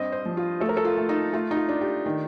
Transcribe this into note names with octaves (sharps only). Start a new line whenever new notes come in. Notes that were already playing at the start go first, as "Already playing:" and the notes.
Already playing: G2 C4 D#5
C5
F3
F4
A3 A4
A#4
A4
F4
A3
D#4
A3 F4
D#4
F4
D4
G4
D#3